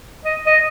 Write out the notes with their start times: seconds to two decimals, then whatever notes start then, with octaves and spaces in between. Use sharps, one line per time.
0.25 D#5
0.47 D#5